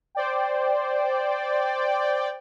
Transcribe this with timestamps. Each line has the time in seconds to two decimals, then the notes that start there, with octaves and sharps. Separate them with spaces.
0.15 C5 D5 G5